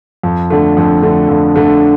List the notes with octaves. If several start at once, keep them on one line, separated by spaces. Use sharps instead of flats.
F2
D3 A3
F2
D3 A3
F2
D3 A3